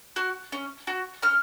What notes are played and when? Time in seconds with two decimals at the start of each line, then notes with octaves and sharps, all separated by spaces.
0.16 F#4
0.52 C#4
0.87 F#4
1.22 C#4 F6